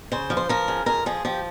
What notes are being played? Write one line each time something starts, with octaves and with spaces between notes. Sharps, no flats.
C#3 C5
F3
C5
F3 A#4
C#3
F2 A#4
F3 G#4
F3 G4